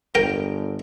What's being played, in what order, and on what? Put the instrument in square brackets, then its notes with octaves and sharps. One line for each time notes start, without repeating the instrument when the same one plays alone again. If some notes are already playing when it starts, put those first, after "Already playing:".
[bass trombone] G1 [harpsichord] A#4 G5